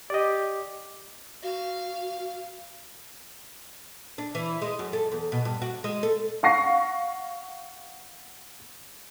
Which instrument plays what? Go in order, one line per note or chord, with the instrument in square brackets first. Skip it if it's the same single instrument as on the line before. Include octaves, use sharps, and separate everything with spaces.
[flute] G4 [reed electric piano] D5 D#5
[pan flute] F#4 [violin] F5
[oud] D4
E3
G#3
F#2
A4
E2
B2
G2
F#4
G#3
A4
[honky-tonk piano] F5 F#5 C#6 A#6 C7